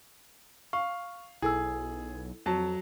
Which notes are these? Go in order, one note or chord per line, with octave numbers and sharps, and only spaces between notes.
F5 C#6
B1 E4 G#4 A4 E6
F2 F#3 A5